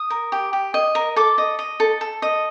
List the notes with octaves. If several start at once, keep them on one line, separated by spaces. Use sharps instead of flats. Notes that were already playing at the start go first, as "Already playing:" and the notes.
Already playing: D#6
A#4
G4
G4
D#5
A#4
A4 D6
D#5
D#5
A4
A4
D#5